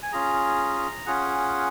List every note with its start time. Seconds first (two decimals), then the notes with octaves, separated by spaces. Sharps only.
0.03 G#5
0.12 C#4 F4 G#4 A#5
1.06 C#4 F4 G#4 F#5